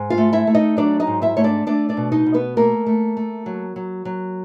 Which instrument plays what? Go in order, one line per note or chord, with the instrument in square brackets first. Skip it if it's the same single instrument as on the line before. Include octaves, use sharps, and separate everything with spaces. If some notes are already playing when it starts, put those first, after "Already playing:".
Already playing: [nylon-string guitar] G#2
F4 F5
A3
E4 E5
A3
D#4 D#5
F#3 D4 D5
D#4 D#5
G#2
E4 E5
A3 C#5
D4 D5
A3 D4 D5
D4 D5
B2
D#4 D#5
B2
B3 B4
A3 A#3 A#4
A3
A3
F#3
F#3
F#3